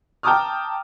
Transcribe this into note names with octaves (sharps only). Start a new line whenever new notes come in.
G5 A5 A#5 D6 D#6 F6